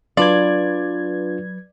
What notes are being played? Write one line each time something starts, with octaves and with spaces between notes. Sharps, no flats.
F#3 D4 F4 B4 D5 G#6